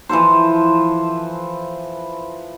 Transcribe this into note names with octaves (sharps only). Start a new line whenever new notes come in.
E3 F3 A4 C5